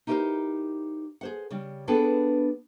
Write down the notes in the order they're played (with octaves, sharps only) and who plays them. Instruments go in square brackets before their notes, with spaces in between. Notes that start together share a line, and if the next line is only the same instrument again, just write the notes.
[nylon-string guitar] D#4 E4 G4 A4 A#4 C5
G#4 C5 F#5
C#3 G3
B3 D4 G#4 A4 B4 G5